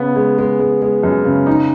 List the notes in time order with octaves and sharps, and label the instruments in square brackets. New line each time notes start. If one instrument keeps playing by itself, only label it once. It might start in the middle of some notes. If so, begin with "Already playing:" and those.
Already playing: [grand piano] C#3 B3
G#3
G#3
G#3
G#3
F#2
C#3
D#4